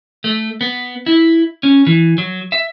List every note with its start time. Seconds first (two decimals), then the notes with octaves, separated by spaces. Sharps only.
0.24 A3
0.61 B3
1.06 E4
1.63 C#4
1.87 E3
2.18 F#3
2.52 E5